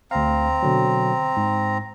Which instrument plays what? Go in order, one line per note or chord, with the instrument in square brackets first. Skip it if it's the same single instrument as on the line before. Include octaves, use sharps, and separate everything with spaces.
[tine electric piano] D2 F5 [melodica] C4 A#5
[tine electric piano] B2 D3 F#3
G#2